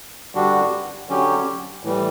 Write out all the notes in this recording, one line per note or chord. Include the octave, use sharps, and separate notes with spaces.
G2 D3 G3 D4 F#4
D3 F#3 C#4 G4
A2 E3 G3